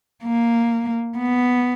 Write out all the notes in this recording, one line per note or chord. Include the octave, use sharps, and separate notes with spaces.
A#3
B3